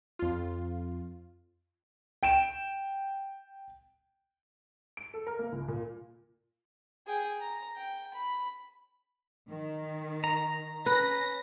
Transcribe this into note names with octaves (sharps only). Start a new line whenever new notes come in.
F2 F4
G5 D7 E7
D7
A4
A#4
A#3
C#2
A#2
G#4 G5
A#5
G5
B5
D#3
A#5
C#4 B4 A#6